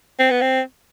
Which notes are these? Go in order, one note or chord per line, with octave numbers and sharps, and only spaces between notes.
C4
B3
C4